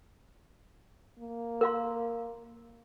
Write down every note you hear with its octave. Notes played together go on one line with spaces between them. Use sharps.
A#3
A#4 F5 C6